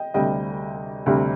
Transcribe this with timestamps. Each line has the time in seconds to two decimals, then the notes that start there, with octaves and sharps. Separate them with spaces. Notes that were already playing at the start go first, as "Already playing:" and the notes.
Already playing: D#5 G5
0.14 D2 C3 G3 D#5 G5
1.06 D2 C3 G3